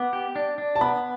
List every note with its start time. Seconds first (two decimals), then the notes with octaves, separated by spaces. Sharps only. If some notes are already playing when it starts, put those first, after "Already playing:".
Already playing: B3 D6
0.13 G4
0.36 D4
0.58 D4
0.76 A5
0.81 B3 B5